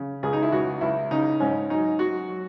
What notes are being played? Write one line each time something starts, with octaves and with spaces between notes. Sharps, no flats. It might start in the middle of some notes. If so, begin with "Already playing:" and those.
Already playing: C#3
C#2 G#4
D#4
E4
C#2 F#4
C#2 E4
C#3 D#4
G#2 C#4
F#3 D#4
F#3 F#4
F#3